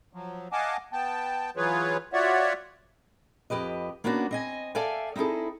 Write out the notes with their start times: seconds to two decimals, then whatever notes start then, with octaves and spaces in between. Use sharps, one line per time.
0.13 F3 F#3
0.52 D#5 F5 F#5 G#5 A5 D6
0.93 B3 G5 A5
1.56 E3 F#3 F4 G#4 B4 C#5
2.13 F4 F#4 C#5 D5 E5 F#5
3.50 F2 G4 B4 D#5
4.04 A#3 B3 C#4 D4 F#4
4.31 C4 D#5 G#5
4.75 A4 D5 E5 F5 G5 G#5
5.16 C4 D#4 E4 G#4 A4